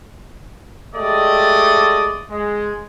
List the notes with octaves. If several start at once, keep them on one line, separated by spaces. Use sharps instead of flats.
G#3 A3 G4 D5 D#5
G#3